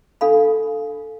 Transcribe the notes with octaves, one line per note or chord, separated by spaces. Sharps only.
D4 A4 F5 B5